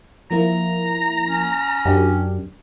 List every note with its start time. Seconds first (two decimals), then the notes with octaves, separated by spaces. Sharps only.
0.31 F3 A#3 E4 A#5
1.27 C#4
1.85 F#2 D4 G4